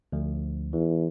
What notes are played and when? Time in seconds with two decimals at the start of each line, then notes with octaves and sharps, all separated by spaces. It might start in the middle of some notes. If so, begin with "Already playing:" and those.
0.12 D2 F3
0.73 E2 E3